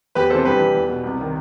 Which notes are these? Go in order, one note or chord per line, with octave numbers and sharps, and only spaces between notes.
E2 G4 B4
C3 E3 A4 C5
G2 G4 B4
E3
E2
B2
C2
C3 D#3